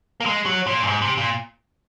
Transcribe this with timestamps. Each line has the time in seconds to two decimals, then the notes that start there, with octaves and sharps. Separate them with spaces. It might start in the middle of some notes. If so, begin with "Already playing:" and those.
0.20 A#3
0.26 G#3
0.46 F#3
0.67 A#2
0.83 F#2
0.87 G#2
1.02 C3
1.18 A#2